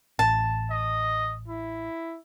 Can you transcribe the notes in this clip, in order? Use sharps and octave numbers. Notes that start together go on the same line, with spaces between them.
A1 A5
D#5
E4